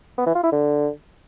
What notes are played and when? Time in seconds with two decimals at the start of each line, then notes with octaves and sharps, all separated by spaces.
0.18 B3
0.26 E3
0.35 F4
0.43 E4
0.52 D3